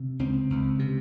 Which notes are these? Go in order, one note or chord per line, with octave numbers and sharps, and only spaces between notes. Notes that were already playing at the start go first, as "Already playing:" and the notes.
Already playing: C3
C#2 C4
C#2
C3